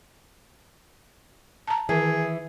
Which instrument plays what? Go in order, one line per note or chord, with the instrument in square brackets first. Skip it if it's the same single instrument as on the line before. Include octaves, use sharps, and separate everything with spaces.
[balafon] A5 A#5
[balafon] D#3 E5 [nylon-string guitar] E3 [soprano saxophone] G#4